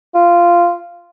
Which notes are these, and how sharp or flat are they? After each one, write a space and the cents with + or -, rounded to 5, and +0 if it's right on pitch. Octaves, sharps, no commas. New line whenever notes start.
F4 -10